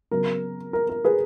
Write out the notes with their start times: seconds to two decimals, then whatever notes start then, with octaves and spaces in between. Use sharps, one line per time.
0.11 C#3 F#3 B3 A#4
0.73 A#4
0.89 A#4
1.05 G#4 B4